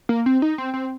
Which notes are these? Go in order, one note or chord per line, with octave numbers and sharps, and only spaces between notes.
A#3
C4
D#4
C4
C4